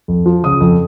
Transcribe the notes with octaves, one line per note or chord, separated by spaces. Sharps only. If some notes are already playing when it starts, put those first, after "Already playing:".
F2
F3
C#3 D#6
F2